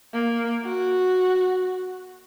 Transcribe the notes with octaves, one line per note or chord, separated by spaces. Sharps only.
A#3
F#4